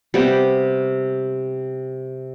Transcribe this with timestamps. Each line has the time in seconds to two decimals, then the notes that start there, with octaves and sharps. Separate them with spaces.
0.14 C3 G3 B3 G4